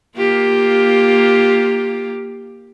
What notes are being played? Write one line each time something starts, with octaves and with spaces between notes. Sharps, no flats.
A#3 F4 G4